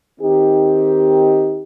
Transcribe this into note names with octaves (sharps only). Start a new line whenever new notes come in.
D#3 C4 D#4 G4